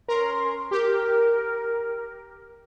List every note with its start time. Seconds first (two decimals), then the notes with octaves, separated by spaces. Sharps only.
0.08 C#4 A#4 C6
0.71 G4 A#4